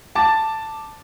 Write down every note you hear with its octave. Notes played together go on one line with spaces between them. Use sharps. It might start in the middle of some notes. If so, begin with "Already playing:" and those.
A5 D6 A6